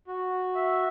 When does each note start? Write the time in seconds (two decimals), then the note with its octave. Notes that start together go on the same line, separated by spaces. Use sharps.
0.07 F#4
0.55 E5